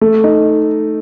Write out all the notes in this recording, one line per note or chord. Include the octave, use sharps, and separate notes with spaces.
A3
D#4